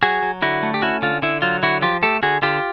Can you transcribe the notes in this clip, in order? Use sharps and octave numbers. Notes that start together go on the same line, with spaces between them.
F#3 F#4 G#4
F#3
D3 E4 F#4
A3
G4
C#4 E4 F#4
D3 F4
D3 E4
F#3 F4
D3 E4 F#4
F3 F4 G4
A3 G4 A4
D3 F#4 G#4
D3 F4 G4